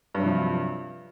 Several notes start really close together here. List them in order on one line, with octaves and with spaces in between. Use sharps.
G2 F#3 C3 F3